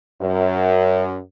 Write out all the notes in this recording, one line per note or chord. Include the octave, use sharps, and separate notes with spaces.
F#2